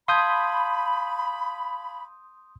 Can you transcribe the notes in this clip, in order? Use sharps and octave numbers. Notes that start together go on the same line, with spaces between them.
F5 A5 B5 C6 D#6 G6 G#6